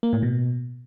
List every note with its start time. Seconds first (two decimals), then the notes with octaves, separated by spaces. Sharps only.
0.03 A#3
0.13 A2
0.22 B2